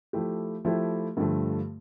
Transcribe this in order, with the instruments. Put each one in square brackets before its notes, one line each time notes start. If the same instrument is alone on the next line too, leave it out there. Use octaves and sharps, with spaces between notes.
[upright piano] F3 A3 E4 G4
F3 A3 E4 G4
G2 D3 F3 A3